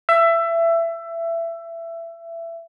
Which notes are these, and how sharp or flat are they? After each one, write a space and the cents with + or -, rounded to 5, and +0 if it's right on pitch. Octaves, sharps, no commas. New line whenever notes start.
E5 +20